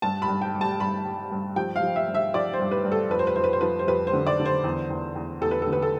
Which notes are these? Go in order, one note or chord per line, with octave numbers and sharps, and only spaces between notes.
G2 A5
B5
G2
G5
G3
A5
G2 B5
G3
G2
F3 G5
F5
F3
E5
G2
E5
F3 D5
C5
G2
B4
G2
A4
F2 B4
C5
B4
F2 C5
B4
C5
F3 B4
C5
F2 B4
C5
D3
D5
D3
C5
E2
E2
E2
E2 A4
B4
A4
D3
B4
A4